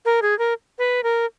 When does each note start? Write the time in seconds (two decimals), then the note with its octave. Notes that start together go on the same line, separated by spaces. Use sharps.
0.05 A#4
0.22 G#4
0.39 A#4
0.79 B4
1.03 A#4